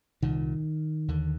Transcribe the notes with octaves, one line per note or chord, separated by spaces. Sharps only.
C2 A#2 D#3
D#2 D3